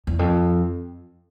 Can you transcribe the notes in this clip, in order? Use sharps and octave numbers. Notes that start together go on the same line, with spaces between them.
E2
F2